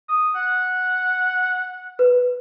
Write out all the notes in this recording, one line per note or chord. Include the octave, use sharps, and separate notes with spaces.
D#6
F#5
B4